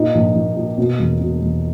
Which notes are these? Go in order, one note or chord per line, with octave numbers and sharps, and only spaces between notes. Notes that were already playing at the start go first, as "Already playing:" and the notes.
Already playing: A#2 D#4
A#1
A#1
A#2
B2
E1
B2
E1